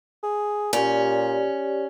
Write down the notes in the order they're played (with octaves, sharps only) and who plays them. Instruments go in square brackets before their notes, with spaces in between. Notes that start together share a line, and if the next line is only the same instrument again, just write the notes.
[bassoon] G#4
[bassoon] A#2 [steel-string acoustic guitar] C#4 [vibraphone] G4 D5